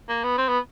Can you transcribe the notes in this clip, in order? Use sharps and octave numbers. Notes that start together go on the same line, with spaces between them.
A#3
B3
C4
B3